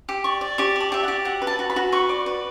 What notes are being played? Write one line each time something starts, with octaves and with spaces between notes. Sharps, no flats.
G4
D5 C#6
D5
G4 C#6
D5 A5
G4 E5
F#5
G4
F#4 F#5
B4
A5
F#4
B5
F#4
B4 C#6
D5
B4